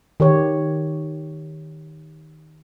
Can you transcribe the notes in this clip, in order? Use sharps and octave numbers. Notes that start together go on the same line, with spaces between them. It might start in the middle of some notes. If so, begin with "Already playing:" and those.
D#3 G4 C#5